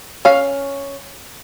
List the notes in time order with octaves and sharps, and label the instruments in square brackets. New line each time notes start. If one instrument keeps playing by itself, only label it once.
[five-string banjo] C#4 F5